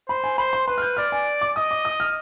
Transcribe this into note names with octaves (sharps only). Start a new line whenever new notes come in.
C5 B5
G#5
C5 B5
C6
B4 C6
F6
G6
D5 F6
G#5
D6
D#5 D#6
D6
D#6
F6